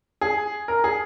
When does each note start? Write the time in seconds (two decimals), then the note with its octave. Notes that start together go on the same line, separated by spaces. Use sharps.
0.21 G#4
0.68 A#4
0.84 G#4